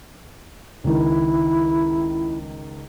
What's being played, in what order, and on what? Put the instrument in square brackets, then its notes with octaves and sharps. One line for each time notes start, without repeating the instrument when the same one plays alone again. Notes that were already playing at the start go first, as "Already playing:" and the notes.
[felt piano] C#2 D#3 [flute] E4